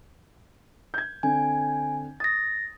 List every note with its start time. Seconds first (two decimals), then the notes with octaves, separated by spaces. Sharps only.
0.94 G6 G#6
1.23 D3 C4 G#5
2.20 D#6 A6 A#6